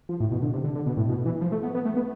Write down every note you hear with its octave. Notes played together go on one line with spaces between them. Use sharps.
F3
A2
B2
D3
C3
D3
D3
B2
A2
B2
E3
F3
A3
B3
B3
A3
B3